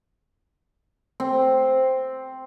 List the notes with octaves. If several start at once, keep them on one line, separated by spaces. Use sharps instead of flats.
C4